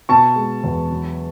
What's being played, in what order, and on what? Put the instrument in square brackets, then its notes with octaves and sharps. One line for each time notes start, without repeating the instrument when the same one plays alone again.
[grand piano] B2 A5 C#6
G#3
E2
F#3